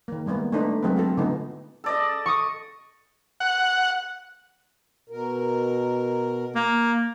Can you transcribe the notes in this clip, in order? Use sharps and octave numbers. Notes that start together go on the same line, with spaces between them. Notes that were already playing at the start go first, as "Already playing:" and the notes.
D#3 A#3
G3 G#3 A#3 B3
A3 D4 D#4 B4 C5
F#3 G#3 C4 A#4 B4
C4 F4 A4
D3 A3 B3 D#4
A4 D5 D#5
C#6 D#6
F#5
B2 A#4
A#3